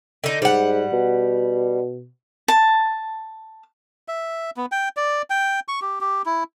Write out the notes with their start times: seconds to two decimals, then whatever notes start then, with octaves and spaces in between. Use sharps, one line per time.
0.24 D3 D#4
0.42 G#2 G3 F#5
0.93 B2
2.48 A5
4.08 E5
4.57 B3
4.72 G5
4.97 D5
5.30 G5
5.68 C#6
5.82 G4
6.01 G4
6.25 E4